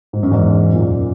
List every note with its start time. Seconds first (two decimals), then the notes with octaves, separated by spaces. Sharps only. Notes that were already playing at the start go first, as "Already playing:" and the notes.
0.13 G#2
0.23 F#2
0.31 E2 G#2
0.74 F#2 A#2